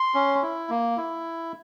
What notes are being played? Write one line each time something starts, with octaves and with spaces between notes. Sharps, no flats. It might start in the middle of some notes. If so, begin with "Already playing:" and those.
Already playing: C6
C#4
E4
A#3
E4